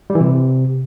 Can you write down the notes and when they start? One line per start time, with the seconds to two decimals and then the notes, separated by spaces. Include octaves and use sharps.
0.10 G3
0.15 E3
0.20 C3